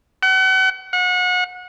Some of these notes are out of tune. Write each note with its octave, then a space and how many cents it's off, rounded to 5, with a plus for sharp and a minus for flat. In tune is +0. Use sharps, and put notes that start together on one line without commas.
F#5 +40
F#5 -30